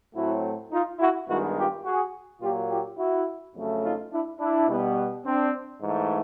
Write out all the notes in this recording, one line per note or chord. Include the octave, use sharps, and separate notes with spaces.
A2 F#3 A3 C4 E4 F#4
D#4 F4
E4 F#4
G2 D#3 G#3 B3 E4 F#4
F4 G4
F#4 G#4
A#2 F#3 A#3 F4 G4
F4 G4
E4 F#4
F2 C#3 F#3 A3
D#4 F4
D4 E4
D4 E4
B2 G3 B3
C4 D4
G#2 E3 A3